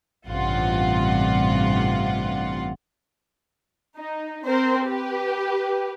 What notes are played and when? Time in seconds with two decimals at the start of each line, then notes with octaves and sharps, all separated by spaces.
0.26 A1 G2 C3 F4 F#5
3.98 D#4
4.46 C4 A#4 C5
4.85 G4 B4